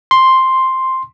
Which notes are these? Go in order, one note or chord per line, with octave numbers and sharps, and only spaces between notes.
C6